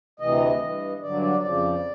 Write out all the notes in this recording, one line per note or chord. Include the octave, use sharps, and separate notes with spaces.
D2 C3 E3 D#5
G2 E3
G2 D3 F#3 D5
D5
F2 C#3 F3 D5